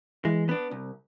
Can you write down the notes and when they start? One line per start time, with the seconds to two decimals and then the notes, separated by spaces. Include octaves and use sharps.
0.25 E3 G#3
0.49 B3 D4
0.71 C2